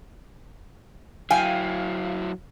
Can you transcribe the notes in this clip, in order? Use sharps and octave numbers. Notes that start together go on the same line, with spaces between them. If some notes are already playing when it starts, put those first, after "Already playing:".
F#3 E4 F5 G5 G#5